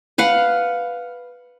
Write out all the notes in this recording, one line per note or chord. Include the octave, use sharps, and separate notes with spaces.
B4 F5 F#5